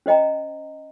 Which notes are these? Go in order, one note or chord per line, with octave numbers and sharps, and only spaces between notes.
C#4 C5 D#5 G5 A#5